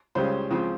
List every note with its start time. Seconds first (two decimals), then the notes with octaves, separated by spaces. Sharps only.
0.15 C#2 C#3 G3 C#4 C5
0.51 C#2 C#3 F3 C4